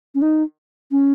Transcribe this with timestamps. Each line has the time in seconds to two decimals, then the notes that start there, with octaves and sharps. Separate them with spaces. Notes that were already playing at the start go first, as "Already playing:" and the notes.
0.15 C#4
0.22 D#4
0.92 C#4